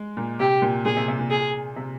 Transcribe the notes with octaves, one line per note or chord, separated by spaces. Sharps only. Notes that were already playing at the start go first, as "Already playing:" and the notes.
Already playing: G#3
A#2
C3 G4
A#2
A#2 G#4
C3
C3
A#2
G#4
C3